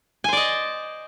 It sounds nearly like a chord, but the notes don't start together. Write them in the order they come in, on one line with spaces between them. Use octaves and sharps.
G#5 C5 D5 D#5